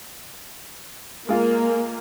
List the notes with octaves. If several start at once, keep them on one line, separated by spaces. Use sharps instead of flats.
G#3 A#3 F4